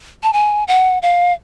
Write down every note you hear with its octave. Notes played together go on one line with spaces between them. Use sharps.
A5
G#5
F#5
F5